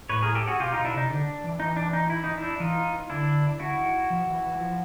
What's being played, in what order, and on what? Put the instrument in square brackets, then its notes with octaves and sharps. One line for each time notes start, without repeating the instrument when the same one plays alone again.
[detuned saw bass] A2 [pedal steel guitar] B4 C#5
[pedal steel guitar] G#4 A#4
G4 A4
F#4 G#4
[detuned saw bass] B2 [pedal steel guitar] F4 G4
[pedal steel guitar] D#4 F4
[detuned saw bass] B2
[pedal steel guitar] D4 E4
[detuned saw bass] C3 [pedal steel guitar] D#4
[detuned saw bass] D3 [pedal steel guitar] D4
[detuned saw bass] E3
[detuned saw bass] E3 [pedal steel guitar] D#4
[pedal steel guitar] D4
D#4
E4
D#4
D4 E4
[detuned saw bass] E3 [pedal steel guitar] D#4 F4
[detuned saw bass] D3 [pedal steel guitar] D4 E4
[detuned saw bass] D3 [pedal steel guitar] E4 F#4
[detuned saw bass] D#3
F3
E3
E3
F3